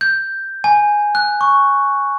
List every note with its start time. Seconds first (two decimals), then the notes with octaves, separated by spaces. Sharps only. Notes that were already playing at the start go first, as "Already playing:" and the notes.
0.01 G6
0.64 G#5
1.15 F#6
1.41 C#6